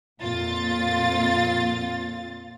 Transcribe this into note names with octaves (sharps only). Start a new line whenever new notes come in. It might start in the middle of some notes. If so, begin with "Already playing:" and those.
F2 A#2 C4 F4 A6